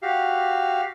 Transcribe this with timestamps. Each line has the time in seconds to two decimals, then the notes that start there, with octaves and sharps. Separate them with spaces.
0.03 F#4 G4 F5